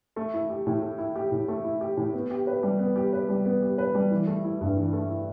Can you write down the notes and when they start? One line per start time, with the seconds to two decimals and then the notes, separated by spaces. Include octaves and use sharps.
0.16 A3
0.34 E4
0.50 G4
0.67 A2
0.82 A3
0.98 E4
1.16 G4
1.32 A2
1.48 A3
1.64 E4
1.81 G4
1.97 A2
2.13 B3
2.30 G4
2.47 B4
2.63 G3
2.79 B3
2.96 G4
3.13 B4
3.29 G3
3.46 B3
3.62 G4
3.78 B4
3.95 G3
4.11 E3
4.27 A3
4.44 E4
4.61 G2
4.77 E3
4.93 A3
5.10 E4